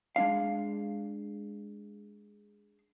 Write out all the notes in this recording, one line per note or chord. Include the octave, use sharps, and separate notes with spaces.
G#3 D4 F5